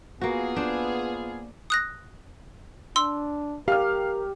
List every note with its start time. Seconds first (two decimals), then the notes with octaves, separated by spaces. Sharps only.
0.21 A#3 B3 F4 F#4 G#4
0.56 D4 C5
1.70 D#6 F#6 A#6
2.96 D4 C6 E6
3.68 G4 A#4 F5 F6